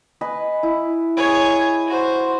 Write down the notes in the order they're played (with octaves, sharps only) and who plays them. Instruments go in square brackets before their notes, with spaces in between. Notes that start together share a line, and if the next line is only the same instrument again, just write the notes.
[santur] B4 D#5 G#5
E4
[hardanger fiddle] G#4 C#5
F#4 C5